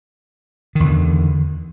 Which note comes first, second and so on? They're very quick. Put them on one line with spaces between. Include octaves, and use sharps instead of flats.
D#3 E2 D3